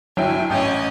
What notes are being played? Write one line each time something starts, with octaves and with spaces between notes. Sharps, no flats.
G1 F#3 E4 G5 G#5
A1 C#4 D#5 G5 G6